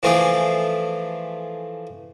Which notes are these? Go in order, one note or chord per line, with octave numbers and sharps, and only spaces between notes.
E3 F3 A3 F4 G#4 D5